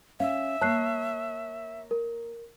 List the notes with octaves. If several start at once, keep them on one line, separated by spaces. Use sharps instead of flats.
C#4 E5 F5
A#3 C#5 A5 F#6 C7
A#4